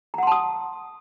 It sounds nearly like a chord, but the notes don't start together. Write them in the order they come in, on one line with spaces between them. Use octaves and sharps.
A#5 F#5 C6 A5 D#6